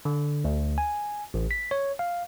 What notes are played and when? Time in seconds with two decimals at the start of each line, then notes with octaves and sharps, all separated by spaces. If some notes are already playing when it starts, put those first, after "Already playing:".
0.05 D3
0.44 D2
0.78 G#5
1.34 A1
1.51 B6
1.71 C#5
1.99 F5